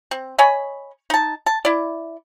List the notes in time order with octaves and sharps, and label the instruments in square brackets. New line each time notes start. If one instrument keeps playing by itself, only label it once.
[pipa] C4
C#5 D#5 G#5 B5
D#4 A5
A5
E4 D5